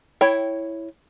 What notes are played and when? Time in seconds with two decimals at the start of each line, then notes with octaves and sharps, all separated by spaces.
0.21 E4 C#5 G5